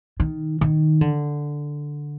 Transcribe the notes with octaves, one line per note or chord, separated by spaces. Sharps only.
D#3
D#3
D3